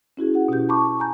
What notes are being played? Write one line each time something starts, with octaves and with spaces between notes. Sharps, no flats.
C#4 E4 F#4 G#4
F#4 G#4 F#5
B2 C#4 E4 G4 G6
A5 B5 C#6 D6
C#6
G#5 A#5 G6